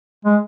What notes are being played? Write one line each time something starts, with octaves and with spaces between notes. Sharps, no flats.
G#3